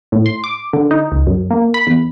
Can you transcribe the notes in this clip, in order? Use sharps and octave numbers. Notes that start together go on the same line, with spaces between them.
A2
C6
D6
D3
D#4
C#2
F#2
A#3
B5
E2